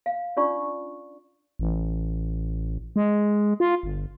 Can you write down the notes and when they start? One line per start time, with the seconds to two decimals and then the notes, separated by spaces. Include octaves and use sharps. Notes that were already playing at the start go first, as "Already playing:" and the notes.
0.06 F5
0.37 C#4 D4 F4 D5 C#6
1.59 A1
2.96 G#3
3.60 F4
3.83 G1